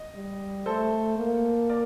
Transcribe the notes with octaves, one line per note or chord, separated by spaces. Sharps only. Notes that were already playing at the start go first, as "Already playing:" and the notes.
Already playing: D#5
G3
A3 A4 C5
A#3
A#4 D5